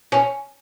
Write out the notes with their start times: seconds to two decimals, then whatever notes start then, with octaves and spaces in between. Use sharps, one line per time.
0.12 C#4